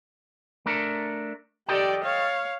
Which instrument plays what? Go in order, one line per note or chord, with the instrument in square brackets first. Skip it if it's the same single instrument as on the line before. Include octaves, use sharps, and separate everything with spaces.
[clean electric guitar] A3 D4 A#4
[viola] G4 D5 [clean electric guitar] A4 D#5 G5
[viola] C#5 F5